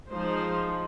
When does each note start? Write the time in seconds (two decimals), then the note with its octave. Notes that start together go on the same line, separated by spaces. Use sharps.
0.10 F3 G#3 D#4 C5